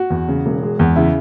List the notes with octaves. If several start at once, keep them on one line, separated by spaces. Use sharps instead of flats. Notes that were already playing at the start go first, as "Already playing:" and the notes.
Already playing: F#4
E2
C#3
E1
G#3
E2
C#3 E4